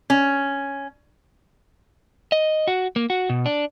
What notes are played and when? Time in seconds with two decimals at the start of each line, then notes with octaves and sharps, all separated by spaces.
0.10 C#4
2.32 D#5
2.67 F#4
2.96 A#3
3.10 F#4
3.30 B2
3.46 D4